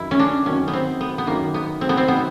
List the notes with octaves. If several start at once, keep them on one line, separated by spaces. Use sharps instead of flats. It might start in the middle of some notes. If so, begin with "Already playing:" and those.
Already playing: F#2 D#3 F#3 E4 F#4
C#4
D4
F#2 D#3 F#3 C#4
B3
C4
B3
B3
F#2 D#3 F#3 A#3
B3
C4
B3
C4
D#3 F#3 B3